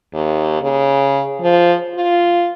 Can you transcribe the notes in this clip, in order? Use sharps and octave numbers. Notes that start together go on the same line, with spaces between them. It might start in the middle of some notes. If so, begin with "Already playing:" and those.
D#2
C#3
F3
F4